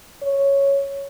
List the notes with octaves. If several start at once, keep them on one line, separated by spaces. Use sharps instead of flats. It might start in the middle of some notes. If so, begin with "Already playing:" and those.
C#5